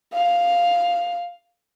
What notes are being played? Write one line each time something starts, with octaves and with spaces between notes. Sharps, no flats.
F5